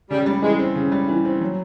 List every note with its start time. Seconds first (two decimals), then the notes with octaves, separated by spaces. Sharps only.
0.10 C#3 G3
0.26 G3
0.42 E3 G#3
0.59 C4
0.76 C#3
0.92 G3
1.08 E3
1.25 C4
1.41 F#3